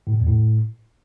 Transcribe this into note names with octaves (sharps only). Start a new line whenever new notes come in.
A2
A#2
E2
A2